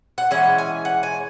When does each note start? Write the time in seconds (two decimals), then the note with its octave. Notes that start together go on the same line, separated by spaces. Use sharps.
0.18 F#5
0.31 E3 G#3 C#4 F#5
0.58 G#5
0.85 F#5
1.03 G#5